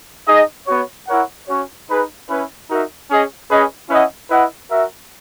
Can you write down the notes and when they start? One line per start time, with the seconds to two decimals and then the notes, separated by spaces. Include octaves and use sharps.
0.27 D#4 G#4 D#5
0.67 B3 F#4 C#5
1.08 E4 A#4 C#5 F#5
1.47 C#4 F#4 C#5
1.88 D#4 G#4 B4
2.28 C#4 E4 B4
2.68 D#4 F#4 A#4 E5
3.09 C#4 G#4 D#5
3.49 C#4 G#4 B4 D#5
3.89 C#4 E4 B4 D#5 F#5
4.29 E4 B4 D#5 F#5
4.69 F#4 A#4 E5